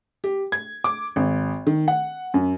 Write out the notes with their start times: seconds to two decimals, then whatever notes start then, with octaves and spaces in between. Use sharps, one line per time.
0.24 G4
0.52 G#6
0.84 D6
1.16 G#1
1.67 D#3
1.88 F#5
2.34 F#2